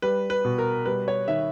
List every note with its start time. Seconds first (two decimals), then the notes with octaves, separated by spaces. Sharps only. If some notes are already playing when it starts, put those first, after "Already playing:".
0.02 G3 B4
0.30 B4
0.45 B2
0.58 A#4
0.86 G3 B4
1.08 C#5
1.28 D#3 E5